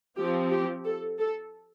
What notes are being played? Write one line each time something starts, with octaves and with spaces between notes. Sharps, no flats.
F3 C4 G4
G4
A4
A4